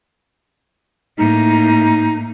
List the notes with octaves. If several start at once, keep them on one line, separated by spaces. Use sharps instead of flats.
A2 A#3 D#4